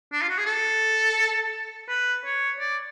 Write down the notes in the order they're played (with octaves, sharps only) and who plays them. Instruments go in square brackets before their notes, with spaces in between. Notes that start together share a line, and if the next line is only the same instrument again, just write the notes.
[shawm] D4
F4
F#4
G#4
A4
B4
C#5
D5